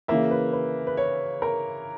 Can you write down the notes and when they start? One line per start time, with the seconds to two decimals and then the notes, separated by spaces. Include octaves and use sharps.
0.08 C#3 E3 A#3 E5
0.31 B4
0.53 B4
0.87 B4
0.97 C#5
1.42 A#4